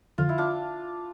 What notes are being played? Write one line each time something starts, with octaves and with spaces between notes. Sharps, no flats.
F2 D3 F3 F4
E4
D4 F4